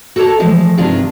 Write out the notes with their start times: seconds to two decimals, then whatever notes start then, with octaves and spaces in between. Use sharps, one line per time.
0.16 F#4 A4 A#4 C5 C#5 A5
0.39 E3 F3 G#3 A3
0.78 G2 C3 D#3 G#3 D4 F4